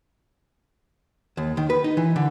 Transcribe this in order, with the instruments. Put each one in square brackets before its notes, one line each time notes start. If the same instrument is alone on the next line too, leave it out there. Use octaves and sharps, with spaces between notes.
[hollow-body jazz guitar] D#2
D#3
B4
D#4
E3
D3